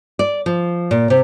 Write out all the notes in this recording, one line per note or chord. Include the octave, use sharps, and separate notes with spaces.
D5
F3
A#2
C3